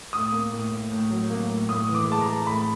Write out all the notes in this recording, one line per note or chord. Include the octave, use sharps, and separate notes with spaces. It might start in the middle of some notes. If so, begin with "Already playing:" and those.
A2 D#6
A#3
A2
A2
A2
F#3
A#3
A2
A2 D#6
E3
D6
G#3 A5
A#5
G#3
A2 B5